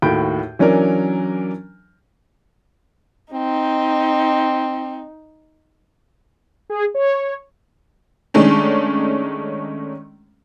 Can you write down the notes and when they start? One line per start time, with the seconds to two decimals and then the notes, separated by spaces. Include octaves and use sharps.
0.02 D#2 A2 F#4 B5 G6 D7
0.59 E3 F#3 C#4 D4 A#4
3.33 C4 D#4
6.70 G#4
6.94 C#5
8.34 D#3 G#3 A3 C#4 D4